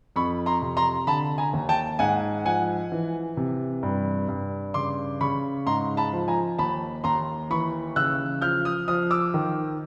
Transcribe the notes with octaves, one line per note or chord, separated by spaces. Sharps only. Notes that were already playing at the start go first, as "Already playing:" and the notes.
F2 B5 C#6
A#5 C6
C3
A#5 C6
D3 A5 B5
G#5 A#5
D#2
G5 A5
G#2 F#5 G#5
F3 F#5 G#5
E3
C3
G2
G2
C#3 C6 D6
C#3 B5 C#6
G#2 A#5 C6
A5 B5
F3
G#5 A#5
D#2 A5 B5
D#2 A#5 C6
E3 B5 C#6
C#3 E6 F#6
F3 F6 G6
D#6 F6
F3 D#6 F6
D6 E6
D#3